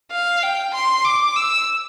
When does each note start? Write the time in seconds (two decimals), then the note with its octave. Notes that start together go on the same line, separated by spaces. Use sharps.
0.12 F5
0.43 G5
0.75 C6
1.05 D6
1.36 E6